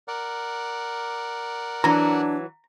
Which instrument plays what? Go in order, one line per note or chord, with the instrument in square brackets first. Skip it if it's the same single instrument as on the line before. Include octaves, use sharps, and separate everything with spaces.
[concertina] A#4 D5 F#5
[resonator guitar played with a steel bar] E3 F#3 [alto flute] D4 [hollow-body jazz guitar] A#5